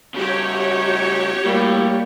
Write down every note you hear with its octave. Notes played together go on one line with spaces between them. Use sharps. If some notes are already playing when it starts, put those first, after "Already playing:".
C#3 G3 F#4 G4 C#5
A2 G3 A#3